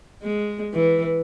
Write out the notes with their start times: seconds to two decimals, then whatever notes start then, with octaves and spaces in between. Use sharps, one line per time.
0.23 G#3
0.73 E3